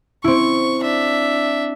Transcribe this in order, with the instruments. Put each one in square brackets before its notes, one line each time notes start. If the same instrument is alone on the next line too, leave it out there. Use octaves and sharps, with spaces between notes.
[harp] C4 E4 [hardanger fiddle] C#6
[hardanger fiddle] D4 E5